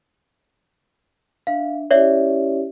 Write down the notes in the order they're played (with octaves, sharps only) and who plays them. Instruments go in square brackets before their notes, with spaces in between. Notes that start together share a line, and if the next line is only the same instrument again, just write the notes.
[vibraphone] D4 E5 [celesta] F5
[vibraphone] C#4 E4 G4 [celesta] C#5 D5 E5